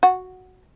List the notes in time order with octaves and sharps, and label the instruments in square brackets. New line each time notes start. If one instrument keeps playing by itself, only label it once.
[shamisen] F#4